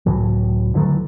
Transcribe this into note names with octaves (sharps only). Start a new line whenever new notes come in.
C#2 A2 E3 F#3
D3 E3 F#3 A3